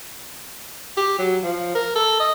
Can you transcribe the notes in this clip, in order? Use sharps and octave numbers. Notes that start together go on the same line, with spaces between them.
G4
F#3
F3
A#4
A4
D#5